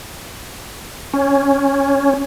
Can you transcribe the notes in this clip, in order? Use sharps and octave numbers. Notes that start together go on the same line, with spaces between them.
C#4